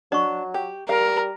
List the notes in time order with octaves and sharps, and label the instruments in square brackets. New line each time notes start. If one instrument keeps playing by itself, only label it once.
[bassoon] F#3 [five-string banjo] D4 [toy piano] D#5 C#6
[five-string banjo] G4
[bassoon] G3 [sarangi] A#4 [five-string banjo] F5